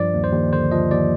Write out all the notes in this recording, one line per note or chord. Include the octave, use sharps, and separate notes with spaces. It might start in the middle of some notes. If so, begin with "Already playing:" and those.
Already playing: G2 F3 D5
D#2
C5
D#2
D3 C5
F3 D#5
D#2 D5